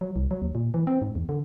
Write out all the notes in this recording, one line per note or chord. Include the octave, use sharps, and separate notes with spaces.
F#3
C2
F#3
D#2
A#2
E3
C4
G#2
E2
D3